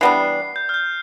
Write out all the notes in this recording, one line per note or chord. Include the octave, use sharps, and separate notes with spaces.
E3 G3 B3 D4 C7
G6
F6
G6